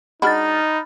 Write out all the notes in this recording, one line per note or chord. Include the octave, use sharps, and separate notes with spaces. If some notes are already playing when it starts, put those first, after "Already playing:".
G#3 D4 D#4 F#4 B5 F6 A6